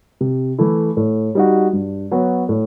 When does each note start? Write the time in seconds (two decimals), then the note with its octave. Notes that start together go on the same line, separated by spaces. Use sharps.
0.21 C3
0.58 E3 A3 E4
0.97 A2
1.35 G3 D#4 F#4
1.73 G2
2.11 F#3 B3 F#4
2.49 A2